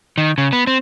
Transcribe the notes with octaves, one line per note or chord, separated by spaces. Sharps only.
D#3
C#3
B3
C4